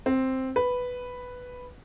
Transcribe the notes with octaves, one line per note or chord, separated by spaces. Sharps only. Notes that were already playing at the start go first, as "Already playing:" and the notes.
C4
B4